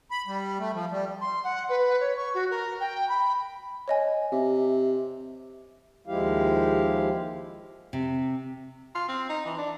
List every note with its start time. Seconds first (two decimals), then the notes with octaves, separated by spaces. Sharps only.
0.11 B5
0.27 G3
0.59 A3
0.74 F3
0.91 G3
1.21 C6
1.43 F#5
1.69 B4
2.00 C#5
2.16 C#6
2.34 F#4
2.50 A#4
2.79 G5
3.08 B5
3.88 C#5 D#5 G#5
4.32 C3 E5
6.07 D#2 F3 G#3 E4 G4 F5
7.93 C3
8.95 F4
9.09 C4
9.29 D#4
9.45 E3
9.58 D4